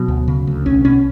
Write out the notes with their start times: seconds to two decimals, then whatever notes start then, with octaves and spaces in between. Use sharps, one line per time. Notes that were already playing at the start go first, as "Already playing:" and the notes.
Already playing: B2 F#3
0.08 D2
0.28 C#3
0.47 D2
0.66 B1 C#4
0.85 B2 C#4